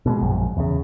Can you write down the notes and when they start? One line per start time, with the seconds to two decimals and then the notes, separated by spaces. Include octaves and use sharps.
0.06 B2 G3 G#3
0.21 A#1 F#2
0.57 E2 C#3